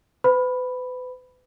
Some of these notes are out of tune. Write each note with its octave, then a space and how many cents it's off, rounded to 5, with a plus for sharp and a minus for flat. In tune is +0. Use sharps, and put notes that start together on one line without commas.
B4 +35 B5 +0